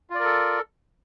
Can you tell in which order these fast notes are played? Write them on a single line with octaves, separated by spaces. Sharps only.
F4 D5 A#4 A4